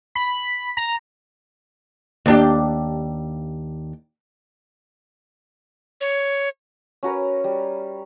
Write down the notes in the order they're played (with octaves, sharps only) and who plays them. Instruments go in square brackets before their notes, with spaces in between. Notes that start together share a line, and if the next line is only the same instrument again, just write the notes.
[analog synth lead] B5
A#5
[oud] D#2 D4 G4
[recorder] C#5
[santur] C#4 F#4 A#4 B4
G3